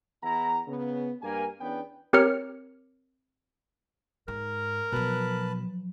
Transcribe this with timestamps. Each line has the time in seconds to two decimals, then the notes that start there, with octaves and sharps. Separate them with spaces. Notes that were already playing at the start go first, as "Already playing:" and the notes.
0.23 E2 E4 F#5 A#5
0.67 C#3 B3
1.21 G2 A#3 G4 A#4 G#5
1.60 E2 B3 C#4 D4 B4 G5
2.13 C4 G4 A#4 C#5 F6 C#7
4.28 G#2 A#4
4.92 B2 F3 F#3 B4 A5 F#6